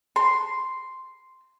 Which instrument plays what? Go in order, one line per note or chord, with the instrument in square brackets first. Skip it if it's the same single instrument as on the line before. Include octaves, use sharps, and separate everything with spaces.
[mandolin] C6